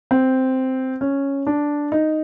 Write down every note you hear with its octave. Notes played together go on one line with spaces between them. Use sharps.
C4
C#4
D4
D#4